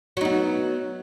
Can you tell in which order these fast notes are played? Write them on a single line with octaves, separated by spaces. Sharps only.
F#3 D#4 B3